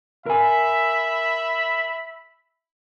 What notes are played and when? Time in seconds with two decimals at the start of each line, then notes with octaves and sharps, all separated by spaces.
0.26 A#4 E5 G#5 B5